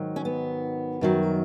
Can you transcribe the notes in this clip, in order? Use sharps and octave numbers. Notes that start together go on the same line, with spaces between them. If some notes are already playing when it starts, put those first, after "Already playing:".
Already playing: G#2 D#3 F#3
C#4
B3
F#2 D#3 F#3